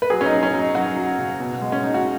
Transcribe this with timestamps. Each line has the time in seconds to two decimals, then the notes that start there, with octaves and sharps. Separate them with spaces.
0.02 B4
0.10 F#3 G#4
0.21 C#4
0.26 D#4
0.32 F#3
0.43 C#4
0.53 F#3
0.59 D#4
0.75 F#3 F#4
0.97 F#3
1.18 C#3
1.40 B2
1.61 G#3
1.72 C#4
1.83 G#3 D#4
1.94 F#4